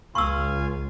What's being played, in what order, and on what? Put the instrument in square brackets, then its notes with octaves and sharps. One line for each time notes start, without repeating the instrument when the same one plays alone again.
[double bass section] C#2 [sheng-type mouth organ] F4 F5 G#5 [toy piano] C#6 E6